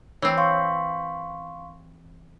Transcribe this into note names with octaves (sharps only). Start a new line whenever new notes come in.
E3 C4 C#5
F5 C6 C#6